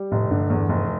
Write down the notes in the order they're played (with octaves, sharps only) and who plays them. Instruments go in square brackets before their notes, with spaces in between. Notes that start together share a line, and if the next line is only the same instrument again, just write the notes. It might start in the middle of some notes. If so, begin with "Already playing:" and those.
Already playing: [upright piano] G3
[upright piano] F1 [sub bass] A2
[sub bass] G2 [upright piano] D3
[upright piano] E2
F1